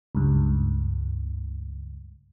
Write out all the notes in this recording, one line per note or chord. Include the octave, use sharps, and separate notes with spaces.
C#2 G2